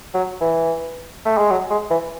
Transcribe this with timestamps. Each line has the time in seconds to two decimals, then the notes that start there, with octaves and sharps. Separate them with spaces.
0.14 F#3
0.41 E3
1.25 A3
1.38 G#3
1.50 F#3
1.70 G#3
1.91 E3